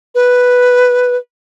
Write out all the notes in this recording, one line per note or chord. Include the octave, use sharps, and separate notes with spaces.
B4